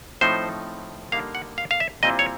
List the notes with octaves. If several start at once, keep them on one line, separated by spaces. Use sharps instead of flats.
A2 F3 A3 C4 D#4 C5
D3 G3 A#3 D#4 F5
F#5
F5
F5
E5
A#2 G3 C4 E4 D#5
C#5